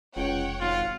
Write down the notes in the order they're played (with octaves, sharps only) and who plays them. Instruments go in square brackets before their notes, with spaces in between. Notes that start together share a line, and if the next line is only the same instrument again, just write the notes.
[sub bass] F1 [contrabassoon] C#2 [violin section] C#5 F#5 G5
[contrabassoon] G#1 [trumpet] F4 [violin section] F#5